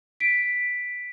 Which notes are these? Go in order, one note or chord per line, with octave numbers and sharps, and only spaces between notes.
B6 D7